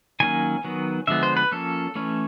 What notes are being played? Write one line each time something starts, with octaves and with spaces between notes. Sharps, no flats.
D#3 F#3 A#3 C#4 G#5
D#3 F#3 B3
D3 F3 G#3 B3 E5
C5
B4
F3 A#3 C#4 A4
E3 A3 C#4